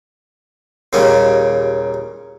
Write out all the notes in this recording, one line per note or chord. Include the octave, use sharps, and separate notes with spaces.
D#2 A#2 C#3 G3 C#4